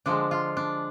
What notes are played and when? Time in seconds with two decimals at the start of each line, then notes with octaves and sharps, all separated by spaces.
0.06 D3 F3 G#3 D4
0.31 F4
0.57 D4